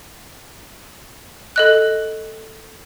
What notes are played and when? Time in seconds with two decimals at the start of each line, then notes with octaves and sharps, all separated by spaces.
1.56 A4 D#5 F#6